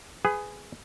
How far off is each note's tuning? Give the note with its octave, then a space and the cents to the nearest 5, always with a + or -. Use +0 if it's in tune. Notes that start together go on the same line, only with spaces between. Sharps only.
G#4 +0 B4 +30